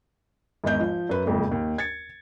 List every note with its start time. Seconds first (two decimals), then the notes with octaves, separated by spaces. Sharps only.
0.64 G#1 E2 D#5 G6
0.80 F3
1.09 F#2 B4
1.26 F#1 F2 G#2
1.51 D#2
1.78 G#6 A6 C#7